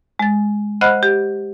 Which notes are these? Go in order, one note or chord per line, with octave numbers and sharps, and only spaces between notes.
G#3 A6
C5 D#5 F#5 B5 F6 F#6
G4